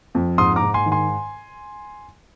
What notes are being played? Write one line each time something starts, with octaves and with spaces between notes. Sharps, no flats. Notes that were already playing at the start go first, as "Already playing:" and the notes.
F2
G#2 C6 D#6
A#5 D6
G#2
G#5 C6
D#3
G#5 C6